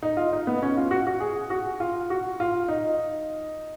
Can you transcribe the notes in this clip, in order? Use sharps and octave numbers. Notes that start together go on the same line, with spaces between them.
D#4
F4
D#4
B3
C#4
F4
F#4
F#4
G#4
F#4
F4
F#4
F4
D#4